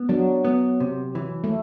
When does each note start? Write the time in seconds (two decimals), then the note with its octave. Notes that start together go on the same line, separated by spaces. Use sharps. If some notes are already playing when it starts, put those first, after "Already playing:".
Already playing: B3
0.09 F#3 D4
0.45 B3
0.80 C3
1.15 E3
1.44 A3